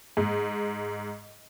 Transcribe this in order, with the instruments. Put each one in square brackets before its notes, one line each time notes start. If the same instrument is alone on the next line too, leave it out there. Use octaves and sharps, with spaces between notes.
[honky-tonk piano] G#2